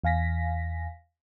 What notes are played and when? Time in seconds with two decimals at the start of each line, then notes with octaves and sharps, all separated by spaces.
0.04 E2 F5 G#5 A#6 B6